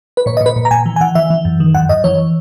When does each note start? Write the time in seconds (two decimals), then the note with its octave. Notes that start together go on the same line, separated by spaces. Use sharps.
0.17 B4
0.26 A#2 C#5
0.37 D#5
0.41 A#2
0.46 B4
0.56 A#2
0.65 A#5
0.71 A#2 G#5
0.86 E3
0.96 G#5
1.01 E3 F#5
1.15 E3 E5
1.30 E3
1.45 F#2
1.60 D#3
1.75 F#2 F#5
1.89 F#2 D#5
2.04 E3 C#5